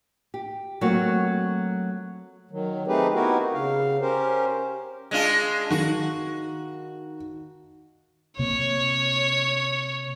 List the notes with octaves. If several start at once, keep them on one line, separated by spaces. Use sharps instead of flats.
G4
F#3 A3 A#3 C4 F#4
D#3 F#3
A3 C4 D#4 G4 G#4 B4
B3 D#4 E4 F#4 G4 A#4
C#3 F5
C#4 G4 A#4 C5
G#3 D4 F4
D#3 F#4
C3 A#3 C#5